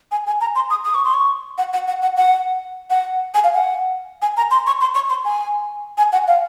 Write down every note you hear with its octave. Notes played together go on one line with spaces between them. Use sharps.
G#5
G#5
A#5
C6
D#6
D#6
C#6
C6
C#6
F#5
F#5
F#5
F#5
F#5
F#5
G#5
F5
F#5
G#5
A#5
C6
C#6
C6
C#6
C6
G#5
G#5
F#5
F5